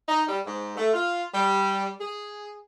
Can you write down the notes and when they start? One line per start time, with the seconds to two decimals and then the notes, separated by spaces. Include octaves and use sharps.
0.09 D#4
0.29 G3
0.46 G#2
0.77 A3
0.94 F4
1.34 G3
2.00 G#4